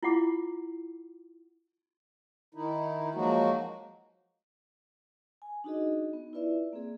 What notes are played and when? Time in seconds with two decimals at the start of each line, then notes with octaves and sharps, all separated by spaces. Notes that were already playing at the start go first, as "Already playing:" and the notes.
0.03 E4 F4 F#5 D6
2.54 D#3 D#4 E4
3.15 F3 F#3 G#3 A#3 D#4 F#4
5.42 G#5
5.64 D4 D#4 F#4 G#4 D#5
6.13 B3 D#4
6.33 E4 F4 B4 D5 E5
6.73 A#3 C4 G#4 D5